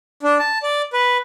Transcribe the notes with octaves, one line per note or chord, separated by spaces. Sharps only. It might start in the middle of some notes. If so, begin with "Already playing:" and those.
D4
A5
D5
B4